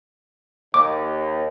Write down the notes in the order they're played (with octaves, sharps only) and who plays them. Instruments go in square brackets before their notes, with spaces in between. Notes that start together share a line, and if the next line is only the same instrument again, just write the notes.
[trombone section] D#2 [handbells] D6